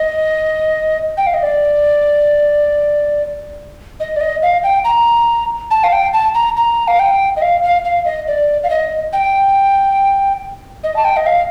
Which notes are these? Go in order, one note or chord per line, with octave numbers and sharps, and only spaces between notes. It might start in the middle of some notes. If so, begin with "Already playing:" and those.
Already playing: D#5
G5
F5
D#5
D5
D#5
D5
D#5
F5
G5
A#5
A5
F5
G5
A5
A#5
A#5
F5
G5
D#5
F5
F5
F5
D#5
D5
F5
D#5
G5
D#5
A5
G5
D#5
F5